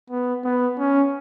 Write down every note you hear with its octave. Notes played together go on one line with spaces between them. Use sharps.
B3
B3
C#4